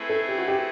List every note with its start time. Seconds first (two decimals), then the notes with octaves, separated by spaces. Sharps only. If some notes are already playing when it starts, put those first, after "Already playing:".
Already playing: A3 C4 E4 G#4 B4
0.09 A4
0.28 G4
0.38 F#4
0.48 G4